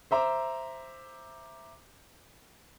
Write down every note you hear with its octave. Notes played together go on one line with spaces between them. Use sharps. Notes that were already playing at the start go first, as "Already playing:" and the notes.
C5 E5 A#5 D6